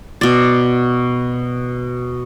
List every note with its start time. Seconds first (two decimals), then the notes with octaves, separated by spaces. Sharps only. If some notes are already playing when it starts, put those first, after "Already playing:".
0.21 B2 D5